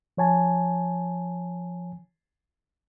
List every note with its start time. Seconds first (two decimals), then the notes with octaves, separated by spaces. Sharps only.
0.17 F3 C#5 G#5 A5